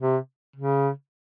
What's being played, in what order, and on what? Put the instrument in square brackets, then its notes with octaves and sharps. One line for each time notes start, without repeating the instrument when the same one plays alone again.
[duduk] C3
C#3